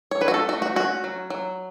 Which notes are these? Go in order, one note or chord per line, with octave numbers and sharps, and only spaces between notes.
C#5
F#3 B4
F#4
A4
A3 F#4
F#4
C#4 F#4
F#3
F#3